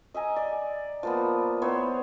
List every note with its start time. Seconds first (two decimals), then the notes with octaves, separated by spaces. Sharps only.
0.14 D#5 E5 G#5 A#5
0.36 D5
1.03 F3 A#3 B3
1.62 B3 E4 C5 C#5